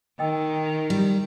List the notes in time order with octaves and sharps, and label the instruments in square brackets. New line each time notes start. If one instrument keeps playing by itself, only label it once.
[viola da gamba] D#3 [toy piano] D#5 G5 E6
[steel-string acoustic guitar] G3